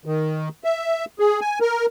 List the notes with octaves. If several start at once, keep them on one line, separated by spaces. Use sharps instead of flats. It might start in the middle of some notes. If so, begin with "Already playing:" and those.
D#3
E5
G#4
G#5
A#4